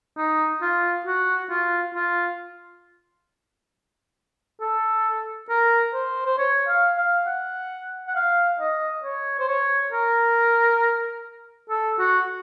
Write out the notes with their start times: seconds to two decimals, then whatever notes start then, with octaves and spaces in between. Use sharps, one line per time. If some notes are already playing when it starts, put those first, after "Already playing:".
0.17 D#4
0.62 F4
1.06 F#4
1.50 F4
1.95 F4
4.61 A4
5.49 A#4
5.93 C5
6.26 C5
6.38 C#5
6.67 F5
6.97 F5
7.26 F#5
8.07 F#5
8.15 F5
8.59 D#5
9.03 C#5
9.39 C5
9.48 C#5
9.93 A#4
11.70 A4
11.99 F#4